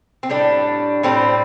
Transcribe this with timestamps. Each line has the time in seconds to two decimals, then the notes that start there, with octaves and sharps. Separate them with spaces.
0.23 C4
0.29 A2 G3 D4
1.03 A2 G3 C4